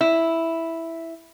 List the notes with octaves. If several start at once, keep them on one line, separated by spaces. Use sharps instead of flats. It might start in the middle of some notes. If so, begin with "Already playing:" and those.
E4